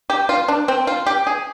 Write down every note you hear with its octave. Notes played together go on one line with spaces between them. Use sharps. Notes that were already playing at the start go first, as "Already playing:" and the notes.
G4
F4
D4
C4
F4
G4
G#4